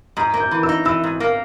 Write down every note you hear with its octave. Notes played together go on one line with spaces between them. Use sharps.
G#2 A#5
A#3
G6
E3
E6
D#4
E3 E6
G#2
A#3